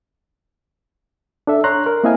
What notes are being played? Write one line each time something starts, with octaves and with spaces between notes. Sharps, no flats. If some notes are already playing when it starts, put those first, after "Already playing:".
D4 A4 E5
C#5 A#5 C6 F#6
A#4
A#3 C4 E4 D#5 F5 G#5